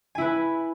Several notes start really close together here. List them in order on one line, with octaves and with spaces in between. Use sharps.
G#5 E4 B4